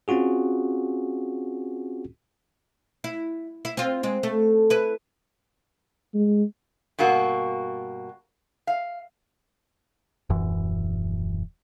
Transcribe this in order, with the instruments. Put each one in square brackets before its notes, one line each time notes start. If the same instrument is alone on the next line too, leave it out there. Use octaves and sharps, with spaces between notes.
[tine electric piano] C4 C#4 F4 F#4 G#4
[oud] E4
E4
C4 F4
G#3 C4
A3
E4 B4
[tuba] G#3
[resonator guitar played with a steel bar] G2 B2 A#3 F#4
F5
[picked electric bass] D#1 F#2 E3